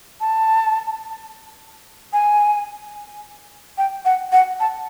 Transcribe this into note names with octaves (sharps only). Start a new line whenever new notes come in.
A5
G#5
G5
F#5
F#5
A5